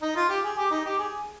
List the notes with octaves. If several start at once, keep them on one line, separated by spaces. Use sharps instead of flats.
D#4
F4
G4
G#4
G4
D#4
G4
G#4